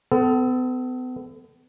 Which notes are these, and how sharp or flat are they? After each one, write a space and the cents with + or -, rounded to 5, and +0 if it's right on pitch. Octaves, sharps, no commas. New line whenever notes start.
B3 +40 A4 +0